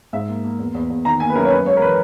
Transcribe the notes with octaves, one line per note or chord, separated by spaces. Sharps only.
G#2 E5
A#3
A#3
E2
E2
E2
D#3 A#5
A#3 G#5
B4
F#2 A#4
C#5
F#2 B4
G#3 C#5
A#4
E3 B4